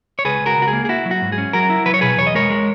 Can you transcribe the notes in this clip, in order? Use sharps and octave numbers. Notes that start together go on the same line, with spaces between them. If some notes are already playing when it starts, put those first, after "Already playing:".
C#5
C#2 G#4 B4
C#2
F#4 A#4
C#2
F#4
G#4
A#3
G#4
E4 F#4
F#3
F#4
G#2
G#4
C#4
F#3 F#4 A#4
E4
F#3 B4
C#5
B2 G#4 B4
E2 C#5
D#5
G#3 A#4 C#5
G#3